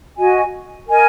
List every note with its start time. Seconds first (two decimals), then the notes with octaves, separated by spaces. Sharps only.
0.18 F#4 D#5 G#5
0.88 A#4 D#5 G#5